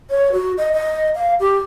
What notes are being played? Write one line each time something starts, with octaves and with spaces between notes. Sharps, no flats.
C#5
F#4
D#5
D#5
F5
G4